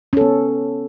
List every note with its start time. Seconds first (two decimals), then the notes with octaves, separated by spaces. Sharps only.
0.13 C#4
0.17 A4
0.21 B3